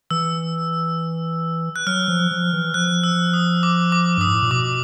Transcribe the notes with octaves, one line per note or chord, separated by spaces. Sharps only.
E3 E6
F#6
F#3 F6
F3
F3
E3
F3 F#6
E6
D#6
D6
D6
G2
D#6
G#2
A2
A#2
B2 D6